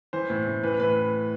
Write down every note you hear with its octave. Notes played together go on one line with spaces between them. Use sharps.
E3 C5
A2
A2
E3 B4
A2 B4